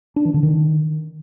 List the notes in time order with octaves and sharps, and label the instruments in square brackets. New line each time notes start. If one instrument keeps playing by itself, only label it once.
[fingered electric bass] D4
E3
D3
D#3